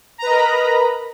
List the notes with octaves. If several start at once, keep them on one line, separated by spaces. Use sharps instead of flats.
A#4 B4 D#5 A#5 B5